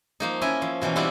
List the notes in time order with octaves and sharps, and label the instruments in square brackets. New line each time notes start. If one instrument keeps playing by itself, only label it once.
[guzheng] F3 A#3 D#4
C#4 E4 D#5 E5 G#5
F3
B2 E3 A#3 C#4
G3 B3 C4 D4 E4 F4